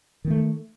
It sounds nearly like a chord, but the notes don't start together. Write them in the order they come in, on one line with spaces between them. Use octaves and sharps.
D#3 A#3 A3